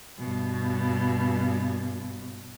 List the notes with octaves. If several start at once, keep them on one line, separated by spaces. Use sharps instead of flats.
G2 B2